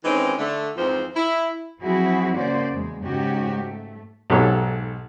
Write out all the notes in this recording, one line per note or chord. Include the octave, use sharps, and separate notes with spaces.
D#3 E3 G#3 C4 C#4 D#4
D3 A3
F2 G#2 E3 F3 C4 C5
E4
F3 F#3 C4 E4 F#4 G#4
C#3 A#3 C#4 F#4 C5 D5
E2 G#3
G#2 C#3 C#4 D#4 F#4 G4
A3
B1 G#2 G4 A4 C#5